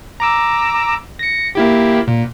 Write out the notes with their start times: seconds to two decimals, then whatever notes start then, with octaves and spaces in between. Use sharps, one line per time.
0.20 A#5 D6 E6
1.19 A#6 C#7
1.55 A#3 E4 G4
2.08 A#2